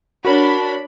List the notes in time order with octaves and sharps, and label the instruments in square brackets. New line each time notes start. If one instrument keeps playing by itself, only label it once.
[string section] D4 B5 [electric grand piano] F#4 A#4 C#5